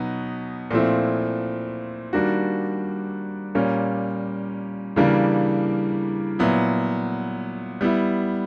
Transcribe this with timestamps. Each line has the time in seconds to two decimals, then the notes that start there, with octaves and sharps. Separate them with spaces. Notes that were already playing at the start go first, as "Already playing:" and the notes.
Already playing: B2 F#3 B3 D#4
0.71 A#2 F3 A3 C4 E4
2.13 D#3 G3 A#3 D4 F#4
3.55 A#2 G3 A#3 C#4
4.96 C#3 E3 G3 A#3 D4
6.39 A#2 F#3 B3 E4
7.81 G3 B3 E4